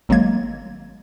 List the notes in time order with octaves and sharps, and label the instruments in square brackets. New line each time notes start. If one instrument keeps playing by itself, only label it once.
[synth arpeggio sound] G#1 F#3 G#3 A#3 G#6